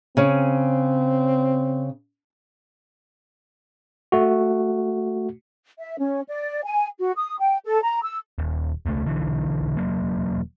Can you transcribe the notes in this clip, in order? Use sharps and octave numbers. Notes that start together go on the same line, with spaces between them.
C#3 C4 C#4
A3 F#4
E5
C#4
D5
G#5
F#4
D#6
G5
A4
A#5
E6
D#1
E1 C#2 A3
B1 D3 E3
E1 F#3 A#3